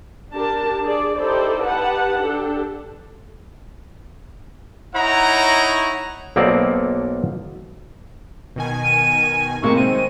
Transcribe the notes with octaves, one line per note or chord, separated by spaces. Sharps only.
D4 G4 A#4 A5
G#4 D5
D#4 E4 G4 A4 C5 D5
D#4 G4 B4 F#5 A5
D4 G4 A4
D#4 E4 C#5 F#5 A#5
B1 B2 A#3 C4 A4 D5
B2 D#3 G#5
D#7
A2 C3 D#3 G#3 A#3 C#6
C4 D#7